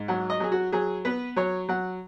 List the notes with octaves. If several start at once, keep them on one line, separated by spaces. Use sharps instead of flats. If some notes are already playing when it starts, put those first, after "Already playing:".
Already playing: G#2
F#3 F#5
D#5
F#3 G#4
F#4
F#3 G#4
B3 B4
F#3 C#5
F#3 F#5